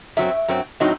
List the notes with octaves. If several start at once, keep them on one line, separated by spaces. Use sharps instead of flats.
F#2 F#3 C4 E5
F#2 F#3 C4
A2 F#3 C4 D#4